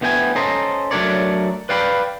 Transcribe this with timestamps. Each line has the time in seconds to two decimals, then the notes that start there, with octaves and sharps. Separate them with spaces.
0.01 D2 B3 E4 G5 G#5
0.36 C#4 A4 C5 D#5 A#5
0.91 F#3 A3 D4 A#4 C#5 D5
1.69 B4 D5 F5 G5 B5